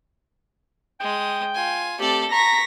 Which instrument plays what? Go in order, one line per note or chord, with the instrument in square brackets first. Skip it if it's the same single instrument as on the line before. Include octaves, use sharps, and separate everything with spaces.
[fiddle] G#3 D#6 [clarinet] G5
[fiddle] F4 G#5
[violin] A3 C4 [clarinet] G4 [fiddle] A4 D5
[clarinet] A#5 [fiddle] C#6 [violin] A#6 B6